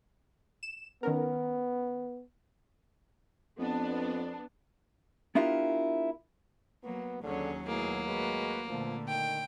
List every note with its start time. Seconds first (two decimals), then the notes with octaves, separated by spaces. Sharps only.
0.63 E7
1.03 D#3 B3 C#4 A#4
3.59 F2 B3 D4
5.35 B3 D4 E4 F4 G4 A#4
6.83 F#3 A#3 B3
7.23 D#2 D3 F#3 C#4 G#4 C#5
7.67 B2 A3 A#3 E4 G#4
8.05 G#3 F#4 B4
8.68 A#2 D3 F3 A3 B3
9.08 D#3 G5